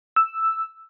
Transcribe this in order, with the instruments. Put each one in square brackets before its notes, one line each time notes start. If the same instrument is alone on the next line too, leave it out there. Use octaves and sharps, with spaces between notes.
[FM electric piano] E6